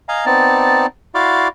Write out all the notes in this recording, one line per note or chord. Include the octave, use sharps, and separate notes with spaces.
D#5 F5 G#5 A#5
B3 C4 D#4 D5 A5
E4 F#4 D5 F5 C6 D6